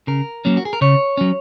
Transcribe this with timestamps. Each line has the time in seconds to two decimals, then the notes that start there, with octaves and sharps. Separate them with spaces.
0.07 C#3 A#4
0.45 F#3 A#3 C#4
0.57 F#4
0.65 G#4
0.73 A#4
0.81 C#3 C#5
1.17 F#3 C#4